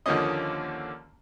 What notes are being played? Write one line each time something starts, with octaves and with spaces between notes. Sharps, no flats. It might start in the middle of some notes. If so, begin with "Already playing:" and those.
D#2 D3 F3 A#3 C#4 D#5